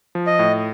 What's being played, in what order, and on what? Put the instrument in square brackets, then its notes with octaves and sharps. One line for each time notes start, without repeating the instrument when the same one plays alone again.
[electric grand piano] F3
[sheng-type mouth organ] D#5
[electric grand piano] A2